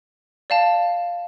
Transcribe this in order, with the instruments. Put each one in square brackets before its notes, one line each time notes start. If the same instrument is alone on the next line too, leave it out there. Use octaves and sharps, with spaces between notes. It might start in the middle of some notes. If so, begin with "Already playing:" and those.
[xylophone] D5 F5 A5